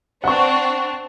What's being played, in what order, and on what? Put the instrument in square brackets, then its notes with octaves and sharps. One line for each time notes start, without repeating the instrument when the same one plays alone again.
[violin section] C4 D4 [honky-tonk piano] F#5 C#6